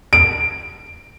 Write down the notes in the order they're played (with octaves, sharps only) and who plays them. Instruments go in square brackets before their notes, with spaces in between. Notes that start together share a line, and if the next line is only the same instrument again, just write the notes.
[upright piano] D7